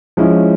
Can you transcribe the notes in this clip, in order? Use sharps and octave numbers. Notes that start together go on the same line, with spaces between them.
F3 G#3 C#4 E4